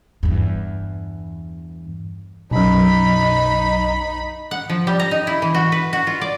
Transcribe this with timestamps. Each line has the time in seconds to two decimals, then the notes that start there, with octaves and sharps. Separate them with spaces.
0.23 E2 G2
2.51 B1 F#2 D#4 B5
4.51 F#5
4.70 F3
4.87 G3
5.00 A#5
5.11 D#4
5.27 E4
5.42 E3
5.54 F#4
5.72 B4
5.93 F#4
6.07 F4
6.21 D5